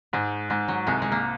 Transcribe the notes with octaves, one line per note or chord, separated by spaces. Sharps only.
G#2 G#3
G#2 G#3
F#3
C2 G#3
G#3
A#3